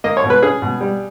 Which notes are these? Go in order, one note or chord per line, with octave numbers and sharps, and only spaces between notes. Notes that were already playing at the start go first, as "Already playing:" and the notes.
A#3 D#5
C#5
B2
B4
C#4 G#4
B2
G3